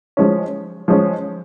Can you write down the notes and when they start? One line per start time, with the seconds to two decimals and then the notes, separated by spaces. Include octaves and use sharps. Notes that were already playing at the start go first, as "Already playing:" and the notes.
0.17 F3 G#3 C#4
0.88 F3 G#3 C#4